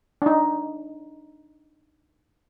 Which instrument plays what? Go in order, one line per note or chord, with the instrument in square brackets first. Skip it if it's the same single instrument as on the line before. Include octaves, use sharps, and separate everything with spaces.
[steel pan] D4 D#4